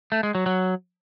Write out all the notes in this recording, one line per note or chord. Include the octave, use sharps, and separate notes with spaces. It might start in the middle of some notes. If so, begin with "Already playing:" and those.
A3
G#3
F#3
F#3